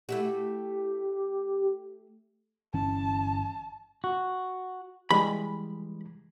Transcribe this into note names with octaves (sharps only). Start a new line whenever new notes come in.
A3 E4 F#4 G4
G1 E3 C#4 A5
F#4
E3 G3 G#3 B5